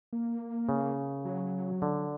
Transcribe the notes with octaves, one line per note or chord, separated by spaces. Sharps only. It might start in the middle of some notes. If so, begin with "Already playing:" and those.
A#3
C#3
F#3
D3